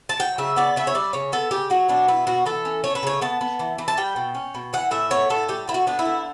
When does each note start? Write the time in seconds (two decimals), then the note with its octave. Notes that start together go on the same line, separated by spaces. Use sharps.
0.09 A5
0.19 F#3 G5
0.38 C#3 E5
0.56 B3 D5
0.76 C#3 E5
0.87 C#5
0.95 G3 D5
1.13 C#3 C#5
1.32 B3 A4
1.51 C#3 G4
1.70 F#3 F#4
1.89 B2 D4
2.08 B3 E4
2.27 B2 F#4
2.46 E3 A4
2.65 C#4
2.84 A3 C#5
2.95 B4
3.03 C#3 C#5
3.22 B3 A5
3.41 B3
3.59 E3
3.78 E3
3.88 A5
3.97 G3 G5
4.16 B2
4.35 C#4
4.55 B2
4.73 E3 F#5
4.91 A2 E5
5.11 B3 C#5
5.29 A2 A4
5.48 G3 G4
5.68 D3 E4
5.74 F#4
5.87 B3 D4
5.99 E4
6.05 D3